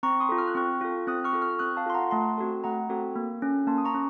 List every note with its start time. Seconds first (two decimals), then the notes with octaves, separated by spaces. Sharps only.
0.03 C4 A#5 C#6
0.20 C6 D#6
0.29 F4 A4
0.38 F6
0.48 F#6
0.55 C4 C#6 F6
0.81 F4 A4
1.07 C4 D#6 F#6
1.24 C#6 F6
1.33 F4 A4
1.42 C#6 F6
1.59 C4 D#6 F#6
1.77 F5 A5
1.86 F4 A4 C6
1.94 F#5 A#5
2.11 A3 A5 C6
2.38 C4 F#4 A4
2.64 A3 F#5 A#5
2.90 C4 F#4 A4
3.16 A#3
3.42 C#4 A4
3.67 A#3 A5 C6
3.78 D#6
3.85 A#5 C#6
3.94 C#4